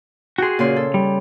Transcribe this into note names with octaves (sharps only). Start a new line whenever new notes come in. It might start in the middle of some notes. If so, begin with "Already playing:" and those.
F#4 G#4 G5 C6
A#2 C#3 C6
A4
G3